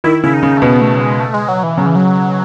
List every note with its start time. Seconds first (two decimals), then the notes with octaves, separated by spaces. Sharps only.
0.04 D#3 E4
0.23 C#3 E4
0.34 D#4
0.43 C#3
0.57 A3
0.62 B2 B3
0.81 A3
0.96 F#3
1.01 G#3
1.20 A3
1.34 G#3
1.48 F#3
1.63 E3
1.77 C#3 F#3
1.86 E3
1.95 F#3